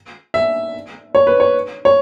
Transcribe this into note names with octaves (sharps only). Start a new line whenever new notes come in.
E5
C#5
B4
C#5
C#5